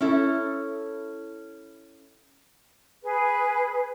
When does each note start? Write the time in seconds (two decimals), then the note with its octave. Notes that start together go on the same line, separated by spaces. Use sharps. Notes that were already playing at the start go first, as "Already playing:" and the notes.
0.01 C#4 E4 A4
3.03 G#4 B4